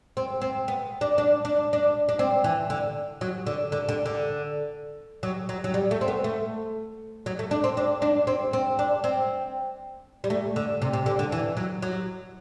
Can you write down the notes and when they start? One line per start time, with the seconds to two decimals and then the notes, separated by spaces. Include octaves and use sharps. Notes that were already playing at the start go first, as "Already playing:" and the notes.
0.17 C4
0.42 C4
0.68 B3
1.01 D4
1.18 D4
1.45 D4
1.73 D4
2.09 D4
2.19 C4
2.44 E3
2.70 D3
3.21 F#3
3.47 D3
3.72 D3
3.89 D3
4.06 D3
5.23 F#3
5.49 F#3
5.64 F#3
5.74 G3
5.91 A3
6.01 C4
6.08 B3
6.24 A3
7.26 F#3
7.39 A3
7.51 D4
7.64 C4
7.77 D4
8.02 D4
8.27 C4
8.53 C4
8.79 D4
9.04 C4
10.24 G3
10.30 A3
10.56 D3
10.82 C3
10.93 C3
11.06 D3
11.19 D3
11.32 E3
11.57 F#3
11.82 F#3